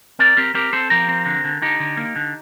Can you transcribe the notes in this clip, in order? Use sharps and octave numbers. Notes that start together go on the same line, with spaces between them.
C4 A#4 D5
C4 G4 A#4
C4 G4 A#4
C4 A4 C5
F3 G4 A#4
C4
D3
D3
D3 D#4 G4
D3
A#3
D3